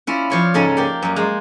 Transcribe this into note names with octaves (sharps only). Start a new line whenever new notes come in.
C#4 E4 F4 D5
F3 C#5 D5
G#2 C#3 C#4 D#4 A4
A#3 G4 D5
F#2 G3
G#3 C5